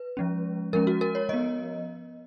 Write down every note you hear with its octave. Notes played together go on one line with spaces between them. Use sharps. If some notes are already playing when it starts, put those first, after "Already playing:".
Already playing: B4
F3 G#3 C#4
F3 G#3 C#4 A#4
F#4
A#4
C#5
F3 B3 D#5